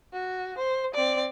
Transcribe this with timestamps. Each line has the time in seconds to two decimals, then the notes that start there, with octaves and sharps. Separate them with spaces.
0.13 F#4
0.58 C5
0.94 C4 D5